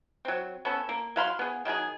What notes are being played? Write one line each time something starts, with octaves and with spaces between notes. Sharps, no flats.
F#3 C4
B3 C#4 A4
A#3
F#3 F5 B5 C6
B3 G#4
D#3 F#3 D#4 G#4